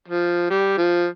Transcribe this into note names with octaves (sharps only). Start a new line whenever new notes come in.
F3
G3
F3